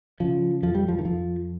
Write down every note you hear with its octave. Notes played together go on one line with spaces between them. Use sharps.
C#3 F3
F2 F3
G3
F3
D#3
F2 F3